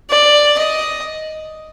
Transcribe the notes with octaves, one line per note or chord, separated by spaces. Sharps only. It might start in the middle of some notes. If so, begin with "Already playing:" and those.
D5
D#5